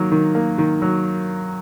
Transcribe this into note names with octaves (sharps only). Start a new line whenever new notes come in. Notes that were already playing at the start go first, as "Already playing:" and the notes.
Already playing: D#3 F#3 A#3
D#3
A#3
D#3
F#3